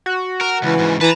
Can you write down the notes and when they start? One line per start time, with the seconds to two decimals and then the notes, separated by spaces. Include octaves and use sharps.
0.06 F#4
0.41 A#4
0.63 C#2 E3
0.79 G#2 C#3
1.01 E3 B4 A5 A#5